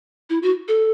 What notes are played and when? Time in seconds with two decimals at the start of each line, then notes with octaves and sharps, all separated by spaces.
0.30 E4
0.42 F#4
0.68 A4